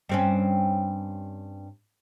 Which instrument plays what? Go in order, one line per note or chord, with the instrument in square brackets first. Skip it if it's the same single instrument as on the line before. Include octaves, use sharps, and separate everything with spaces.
[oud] G2 C4 C#4